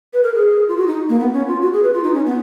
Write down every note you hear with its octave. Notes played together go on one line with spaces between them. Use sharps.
B4
A#4
G#4
F4
F#4
D#4
A#3
B3
C#4
F4
F#4
G#4
B4
F4
D#4
C#4
B3